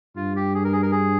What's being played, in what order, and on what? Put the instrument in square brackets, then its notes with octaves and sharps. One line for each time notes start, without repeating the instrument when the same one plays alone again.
[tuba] G2 [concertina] F4
[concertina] G4
G#4
A#4
G#4
A#4
G#4